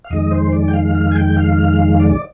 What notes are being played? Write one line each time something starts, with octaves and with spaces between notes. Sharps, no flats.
F5
F2 D#3 G#3 D#5
C5
D5
G5
F5
F5
G#5
G5
F5
D5